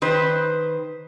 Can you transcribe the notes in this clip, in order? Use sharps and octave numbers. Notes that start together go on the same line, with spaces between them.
D#3 B4 C5